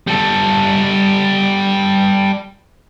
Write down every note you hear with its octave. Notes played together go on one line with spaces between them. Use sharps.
G3 A4